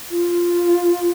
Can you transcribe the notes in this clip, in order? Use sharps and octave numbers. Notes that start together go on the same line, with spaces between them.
F4